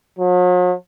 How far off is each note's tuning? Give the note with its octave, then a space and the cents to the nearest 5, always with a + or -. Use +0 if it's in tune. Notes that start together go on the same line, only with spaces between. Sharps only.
F#3 -45